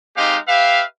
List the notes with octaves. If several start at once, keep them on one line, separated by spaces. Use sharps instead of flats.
G#3 C4 D#4 G4 F5
G4 B4 E5 F5